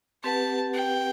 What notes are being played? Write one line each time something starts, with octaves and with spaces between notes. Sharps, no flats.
C4 G4 B4 F#5 A5
G5